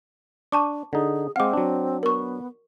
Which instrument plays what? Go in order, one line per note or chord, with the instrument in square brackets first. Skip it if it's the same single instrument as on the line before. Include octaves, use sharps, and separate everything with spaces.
[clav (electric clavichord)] D4 [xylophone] A5 C#6 D6
[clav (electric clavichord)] D3 D#4 [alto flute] G#4
[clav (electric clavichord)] G#3 F5 [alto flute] C4 [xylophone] F#5 D6
[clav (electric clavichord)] F#3 D4
[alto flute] B3 [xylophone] A#4 C#6